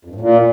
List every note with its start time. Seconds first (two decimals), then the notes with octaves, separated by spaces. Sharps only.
0.05 F2
0.10 G2
0.15 A2
0.20 A#2